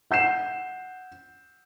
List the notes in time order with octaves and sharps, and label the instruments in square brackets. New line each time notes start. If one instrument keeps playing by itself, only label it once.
[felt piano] F#5 G6 C7 E7